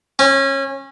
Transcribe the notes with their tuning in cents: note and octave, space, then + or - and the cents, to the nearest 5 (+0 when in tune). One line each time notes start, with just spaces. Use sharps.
C#4 -25